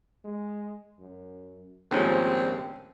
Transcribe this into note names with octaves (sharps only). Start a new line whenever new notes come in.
G#3
F#2
A#1 D#2 G#2 F3 A3 C4 C#4 G#5